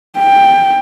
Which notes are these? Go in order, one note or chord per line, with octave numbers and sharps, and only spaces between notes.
G5